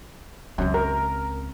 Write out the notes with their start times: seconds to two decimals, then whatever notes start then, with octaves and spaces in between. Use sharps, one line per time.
0.58 C#2 F#2 C4
0.74 A#4